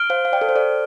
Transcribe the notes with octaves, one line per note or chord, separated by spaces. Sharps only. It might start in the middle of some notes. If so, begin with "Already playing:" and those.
Already playing: F6 D7 G7
C5 F5
F5
D5 G5
A4
C5
A4 D5